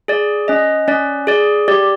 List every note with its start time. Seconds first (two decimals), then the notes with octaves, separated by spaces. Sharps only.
0.08 G#4 D5
0.48 C#4 D#5
0.88 C#4 D5
1.27 G#4 D5
1.68 G4 D5